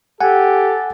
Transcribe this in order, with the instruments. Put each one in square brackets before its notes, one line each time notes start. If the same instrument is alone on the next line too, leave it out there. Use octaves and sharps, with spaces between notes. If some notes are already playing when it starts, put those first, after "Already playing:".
[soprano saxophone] G4 [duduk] A4 [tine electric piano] F#5 G#5